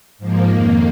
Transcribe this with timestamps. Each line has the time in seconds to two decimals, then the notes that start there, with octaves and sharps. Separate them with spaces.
0.18 G#2 F3 A#3
0.49 F2 D#3 A#3